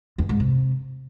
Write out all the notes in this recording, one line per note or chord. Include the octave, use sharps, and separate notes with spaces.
E2
G#2
C3